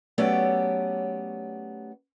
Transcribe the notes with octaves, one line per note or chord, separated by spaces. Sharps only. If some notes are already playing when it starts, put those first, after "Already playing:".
F#3 A3 B3 C#4 G4 D5